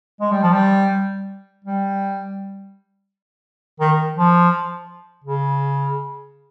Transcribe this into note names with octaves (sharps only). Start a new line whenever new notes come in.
G#3
G3
F3
G3
G3
D#3
F3
C#3